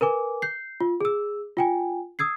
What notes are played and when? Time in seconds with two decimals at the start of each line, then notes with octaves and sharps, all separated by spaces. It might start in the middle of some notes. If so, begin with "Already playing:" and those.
0.01 A#4 B4 G#5 D6
0.42 G6 C7
0.80 F4
1.01 G#4 E6
1.57 F4 G5 G#5
2.19 D#6 E6 G#6 C7